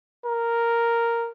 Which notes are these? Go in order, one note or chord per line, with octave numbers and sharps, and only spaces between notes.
A#4